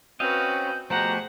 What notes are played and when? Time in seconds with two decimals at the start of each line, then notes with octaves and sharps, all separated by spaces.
0.20 C4 C#4 F#4 B4 D#5 F5 G6
0.90 B2 F3 A3 G4 G#4 C5 F#5 A#5